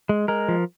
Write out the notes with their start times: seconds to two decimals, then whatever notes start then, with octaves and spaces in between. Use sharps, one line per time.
0.09 G#3
0.28 G#3 A#4
0.48 F3